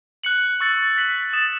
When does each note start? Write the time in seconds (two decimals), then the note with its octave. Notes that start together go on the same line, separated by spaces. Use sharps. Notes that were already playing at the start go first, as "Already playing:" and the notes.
0.24 F#6 C#7 F#7
0.60 C#6 E6 A6 C#7
0.96 F#6 B6 F#7
1.33 D#6 A6 E7